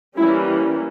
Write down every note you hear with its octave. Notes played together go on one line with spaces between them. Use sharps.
E3 G3 A#3 C#4 E4